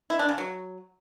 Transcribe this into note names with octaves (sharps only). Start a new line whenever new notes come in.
E4
D4
C#3
F#3